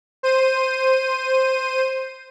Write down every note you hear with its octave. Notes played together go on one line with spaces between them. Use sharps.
C5 D#7